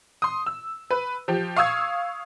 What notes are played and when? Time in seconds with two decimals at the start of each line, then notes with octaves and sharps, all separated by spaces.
0.22 C6 D#6
0.46 E6
0.91 B4
1.28 F3 G4
1.56 F5 C#6 D#6 E6 G#6